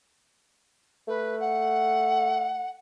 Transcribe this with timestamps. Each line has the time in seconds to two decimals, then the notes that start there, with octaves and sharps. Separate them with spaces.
1.08 A3 B4
1.40 F#5